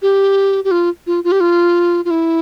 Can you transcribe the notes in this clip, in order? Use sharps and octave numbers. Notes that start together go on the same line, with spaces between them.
G4
G4
F4
F4
F4
G4
F4
F4
E4